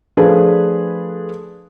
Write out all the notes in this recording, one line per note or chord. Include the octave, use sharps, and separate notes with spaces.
F3 A3 D4 G#4 B4